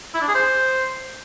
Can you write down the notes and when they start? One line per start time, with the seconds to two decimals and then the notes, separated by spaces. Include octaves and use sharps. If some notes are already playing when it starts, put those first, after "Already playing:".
0.14 E4
0.21 D4
0.28 G#4
0.35 C5